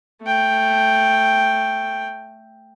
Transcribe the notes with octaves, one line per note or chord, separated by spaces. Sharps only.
A3 G5